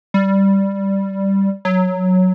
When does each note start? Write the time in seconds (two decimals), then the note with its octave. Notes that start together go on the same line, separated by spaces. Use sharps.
0.14 G3
1.65 F#3